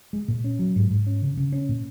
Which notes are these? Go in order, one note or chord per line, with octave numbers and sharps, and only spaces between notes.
G#3
A#2
C#4
F#3
G#2
G#2
C#4
C#3
C#3
C#4
A#2